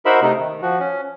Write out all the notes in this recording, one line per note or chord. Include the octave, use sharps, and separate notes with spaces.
D#4 F#4 A#4 C5 E5 B5
C3 A3 D#4
D#3
F3 F#4
C#4